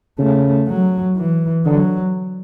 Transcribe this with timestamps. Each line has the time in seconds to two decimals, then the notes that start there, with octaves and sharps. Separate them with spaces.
0.19 C#3 A3
0.68 F#3
1.16 E3
1.65 D3 F#3